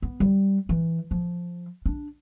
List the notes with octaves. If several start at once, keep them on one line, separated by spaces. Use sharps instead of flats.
B3
G3
E3
F3
D4